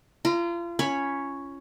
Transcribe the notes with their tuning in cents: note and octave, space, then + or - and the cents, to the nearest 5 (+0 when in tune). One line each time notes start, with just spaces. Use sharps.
F4 -35 A#5 +0
C#4 +0 C#5 +0 B5 +0